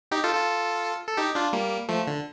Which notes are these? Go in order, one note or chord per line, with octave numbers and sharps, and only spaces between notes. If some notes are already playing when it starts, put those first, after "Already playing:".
D#4 G4
F4 A4
F4 A4
A4
D#4 G4
D4 F4
G3 A#3
F3 A3
D3